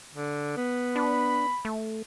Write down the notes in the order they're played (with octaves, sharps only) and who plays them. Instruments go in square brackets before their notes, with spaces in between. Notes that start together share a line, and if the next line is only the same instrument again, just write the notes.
[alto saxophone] D3
B3
[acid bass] D4 [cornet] B5
[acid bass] A3